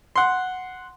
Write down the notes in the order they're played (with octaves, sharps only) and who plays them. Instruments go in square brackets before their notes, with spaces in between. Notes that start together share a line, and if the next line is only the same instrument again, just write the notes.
[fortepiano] F#5 C6